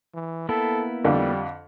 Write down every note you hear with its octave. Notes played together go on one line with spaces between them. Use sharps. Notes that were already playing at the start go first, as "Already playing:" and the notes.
E3
A#3 B3 E4 A4
F2 D3 G3